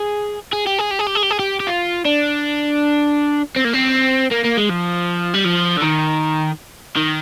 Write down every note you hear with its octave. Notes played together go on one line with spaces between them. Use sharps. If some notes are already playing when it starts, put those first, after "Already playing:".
Already playing: G#4
G#4
G4
G#4
G4
G#4
G4
G#4
G4
G#4
G4
G4
F4
D4
C4
A#3
C4
A#3
A#3
G#3
F3
G3
F3
D3
D#3
D#3